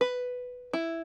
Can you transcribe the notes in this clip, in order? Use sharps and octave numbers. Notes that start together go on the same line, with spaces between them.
B4
E4